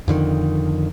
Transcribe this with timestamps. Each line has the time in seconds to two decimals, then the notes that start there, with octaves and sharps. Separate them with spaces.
0.08 F2 D3 D#3